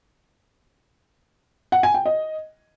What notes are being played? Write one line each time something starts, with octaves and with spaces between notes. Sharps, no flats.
F#5
G#5
G5
D#5